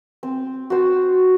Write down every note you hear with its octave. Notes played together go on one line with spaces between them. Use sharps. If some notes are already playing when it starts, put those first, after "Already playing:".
C4
F#4 C5